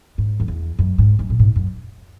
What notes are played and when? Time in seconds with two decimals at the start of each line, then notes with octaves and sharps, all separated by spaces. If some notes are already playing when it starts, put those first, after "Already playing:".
0.18 G#2
0.40 F#2
0.48 E2
0.79 F#2
0.98 G#2
1.19 F#2
1.30 A#2
1.39 G#2
1.56 F#2